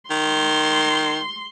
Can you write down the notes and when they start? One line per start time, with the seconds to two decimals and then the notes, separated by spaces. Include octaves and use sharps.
0.10 D#3 C6